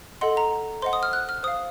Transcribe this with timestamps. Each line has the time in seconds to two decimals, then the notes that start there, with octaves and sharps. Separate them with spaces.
0.21 A4 D#5 F#5 C6
0.37 A#5
0.82 C5 D#5 F#5 C6
0.93 D#6
1.03 F6
1.13 F#6
1.29 F6
1.43 C5 F5 D#6